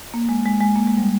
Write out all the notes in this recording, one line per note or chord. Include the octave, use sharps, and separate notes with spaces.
A#3
G#3
G#3
G#3
A#3
G#3
G3